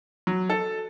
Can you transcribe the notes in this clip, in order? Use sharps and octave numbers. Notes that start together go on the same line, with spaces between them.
F#3
A4